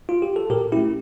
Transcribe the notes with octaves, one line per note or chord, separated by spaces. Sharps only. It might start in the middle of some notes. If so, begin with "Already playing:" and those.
F4
G4
A4
A#2 G4 A#4
A3 C#4 E4 G4